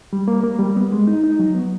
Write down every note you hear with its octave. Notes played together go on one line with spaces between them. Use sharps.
G3
A#3
A#3
G3
B3
G#3
D#4
D#4
F#3
B3